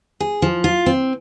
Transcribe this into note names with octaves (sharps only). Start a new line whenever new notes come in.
G#4
F3
F4
C4